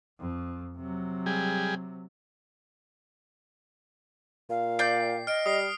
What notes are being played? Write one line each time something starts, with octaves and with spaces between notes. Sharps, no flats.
F2
C3 F#3
G3 G#4
A#2 F5
D5 G5 G6 C7
D#5 F6 D7
G3 D#6 C7